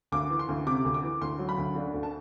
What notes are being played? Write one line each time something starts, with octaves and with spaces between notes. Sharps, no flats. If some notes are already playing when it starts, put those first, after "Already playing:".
D2 D6
E3
C6
D2
C3 D6
D2
D6
E3
D2 C6
F#3
B5
D2
D3
D2
A5